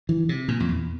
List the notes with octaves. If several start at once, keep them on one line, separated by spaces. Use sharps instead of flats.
E3
C3
A#2
F2
E2